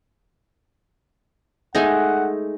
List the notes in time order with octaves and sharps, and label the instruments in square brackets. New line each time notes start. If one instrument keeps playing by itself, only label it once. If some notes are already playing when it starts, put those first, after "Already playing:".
[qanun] G#3 A3 D#4 [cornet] F#5